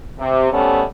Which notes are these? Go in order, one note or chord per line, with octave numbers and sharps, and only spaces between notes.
C3
C3 G3 A3 B3 C#4